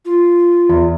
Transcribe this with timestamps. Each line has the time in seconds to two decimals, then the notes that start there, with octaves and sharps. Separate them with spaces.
0.05 F4
0.69 E2